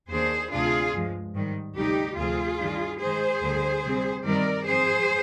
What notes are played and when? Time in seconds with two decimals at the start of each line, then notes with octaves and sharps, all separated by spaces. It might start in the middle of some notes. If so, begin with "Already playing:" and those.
0.10 D#2 D#3 A#3 D4 G#4 C5
0.51 D2 C3 G3 D4 F4 G#4
0.93 G2 F3 G#3
1.35 G#2 D#3 G3
1.76 D2 C3 G3 D#4 G4
2.18 D2 C3 F3 C4 F4 G#4
2.59 G2 D#3 G3 D4
3.00 G#2 D#3 G#3 G#4 C5
3.42 D2 D3 G3
3.83 C3 G3 C4
4.25 G2 D#3 G3 C4 A#4 D5
4.66 G#2 F3 C4 G#4 C5